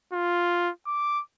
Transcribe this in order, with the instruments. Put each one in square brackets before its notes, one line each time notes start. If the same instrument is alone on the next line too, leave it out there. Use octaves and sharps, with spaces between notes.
[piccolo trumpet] F4
D6